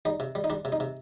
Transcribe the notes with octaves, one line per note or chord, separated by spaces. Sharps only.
G3 D#4
C3
G3
D#4
G3 D4
C3
D#4
C3